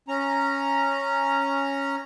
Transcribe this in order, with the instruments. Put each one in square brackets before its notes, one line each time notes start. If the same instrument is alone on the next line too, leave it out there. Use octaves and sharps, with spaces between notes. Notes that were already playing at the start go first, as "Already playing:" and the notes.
[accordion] C#4 A#5